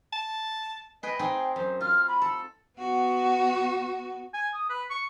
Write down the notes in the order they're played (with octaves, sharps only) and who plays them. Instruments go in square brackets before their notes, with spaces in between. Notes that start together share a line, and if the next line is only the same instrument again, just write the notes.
[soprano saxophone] A5
[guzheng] G#4 B4 G5 [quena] D#5
[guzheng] C4 D#4 G#4 [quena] G5
[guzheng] F#2 [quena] C5
[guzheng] F4 [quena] F6
[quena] B5
[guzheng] A4
[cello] B3 F#4
[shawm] G#5
D#6
B4
C#6